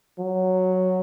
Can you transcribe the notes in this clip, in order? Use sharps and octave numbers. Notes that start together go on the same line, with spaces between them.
F#3